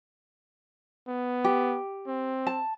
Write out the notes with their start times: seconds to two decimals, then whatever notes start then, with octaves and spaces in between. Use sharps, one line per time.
1.08 B3
1.44 G4
2.07 C4
2.47 A5